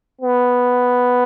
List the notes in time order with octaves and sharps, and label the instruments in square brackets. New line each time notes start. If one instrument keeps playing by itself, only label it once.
[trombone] B3